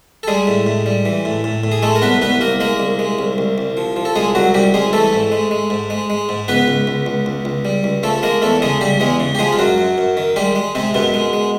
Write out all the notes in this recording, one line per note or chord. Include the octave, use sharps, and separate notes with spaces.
A4
G3 G#3 G#4
A2
A2
G3
E3
A2
A2
A2
G#4
G#3 A3 A4
A#4
C2 B3 B4
C2 B3 B4
C2 A#3 A#4
G#3 A#3 A#4
C2
G#3
C2
C2
C2
F3
F3
A4
C2 G#3 G#4
C2 F#3 F#4
C2 G3 G4
C2 G#3 G#4
E3 A3 A4
G#2
G#3
G#3
G#2
G#3
G#3
G#2
C#2 B3 B4
C#2
C#2
C#2
C#2
C#2
G3
C#2
F3 A3 A4
G#3 A#3 A#4
E2 A3 A4
C#3 G#3 G#4
C#3 G3 G4
E2 G#3 G#4
C#3
G4
F3 G#3 G#4
F4
F#2 F#3 F#4
F#2
F#2
D#3
G3 G#3 G4
G#3
C3 G#3 C4
F#2 B2 B3
G#3
G#3